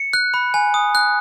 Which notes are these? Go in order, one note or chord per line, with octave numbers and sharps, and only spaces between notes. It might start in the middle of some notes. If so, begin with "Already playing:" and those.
Already playing: C#7
F#6
B5
G#5
D#6
F#6